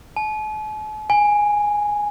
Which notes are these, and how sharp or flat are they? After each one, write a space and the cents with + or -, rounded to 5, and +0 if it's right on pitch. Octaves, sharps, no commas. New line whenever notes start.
A5 -45
G#5 -5